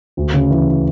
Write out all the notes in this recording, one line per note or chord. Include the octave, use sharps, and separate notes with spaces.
D2
C#3
E3